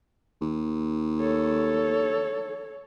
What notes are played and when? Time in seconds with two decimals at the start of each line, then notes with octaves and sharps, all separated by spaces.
0.41 D#2
1.20 A4 C#5